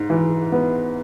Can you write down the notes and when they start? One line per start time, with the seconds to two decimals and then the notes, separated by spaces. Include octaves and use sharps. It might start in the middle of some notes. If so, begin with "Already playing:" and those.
Already playing: G#2
0.10 E3
0.52 B3